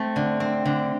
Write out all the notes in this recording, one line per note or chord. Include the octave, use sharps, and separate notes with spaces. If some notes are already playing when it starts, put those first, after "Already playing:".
Already playing: A3 C4
D3
C4
D3